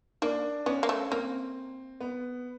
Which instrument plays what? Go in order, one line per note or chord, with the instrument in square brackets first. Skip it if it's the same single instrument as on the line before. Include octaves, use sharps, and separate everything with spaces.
[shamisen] A#3 [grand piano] D4
[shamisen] B3 [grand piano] C#4
[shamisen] A#3
A3
[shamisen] A#3 [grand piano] C4
[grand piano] B3